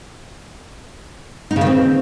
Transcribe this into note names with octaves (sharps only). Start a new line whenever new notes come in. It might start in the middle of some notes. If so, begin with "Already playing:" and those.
D#4
C#3
D#3
C4